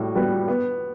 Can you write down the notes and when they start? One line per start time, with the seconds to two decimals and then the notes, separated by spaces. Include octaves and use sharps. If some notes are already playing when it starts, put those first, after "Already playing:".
Already playing: A2 G3 F#4
0.15 G3 B3 F#4 B4
0.48 B3